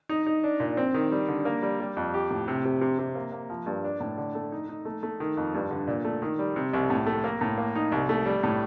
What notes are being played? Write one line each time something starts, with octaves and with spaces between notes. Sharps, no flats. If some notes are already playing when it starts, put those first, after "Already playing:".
D#4
D#4
D4
A#2
C4
D#3
G3
D3
A#3
G3
G3
F2
G4
A2
C3
C3
C3
C3
A#3
A#3
F3
G2
D4
A2
D3
A3
D#4
D#4
A3
A3
D#3
F2
G2
D3
A#2
A3
D#3
G3
C3
C2
A2
A3
A#3
A2
A#3
D#4
C2
A3
G3
A2